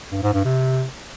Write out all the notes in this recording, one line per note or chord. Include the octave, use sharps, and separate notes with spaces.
G2
G#2
G2
C3